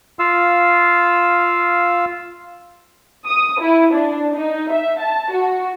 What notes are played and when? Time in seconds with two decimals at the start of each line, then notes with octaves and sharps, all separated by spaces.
0.19 F4 F5 E6
3.27 D#6
3.60 E4
3.92 D4
4.33 D#4
4.70 E5
5.00 A5
5.32 F#4